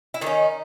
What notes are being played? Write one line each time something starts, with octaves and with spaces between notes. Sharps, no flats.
E4
D#3 A3 D#4
C#4